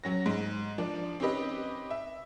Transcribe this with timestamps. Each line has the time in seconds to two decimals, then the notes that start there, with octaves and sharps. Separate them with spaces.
0.04 F#3 C#4 A#6
0.26 G#2
0.78 F3 D4
1.20 C4 C#4 D#4 G4 B4 D#5
1.91 E5